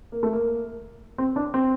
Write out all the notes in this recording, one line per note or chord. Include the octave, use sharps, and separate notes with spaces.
A#3
A3
A#3
C4
D4
C4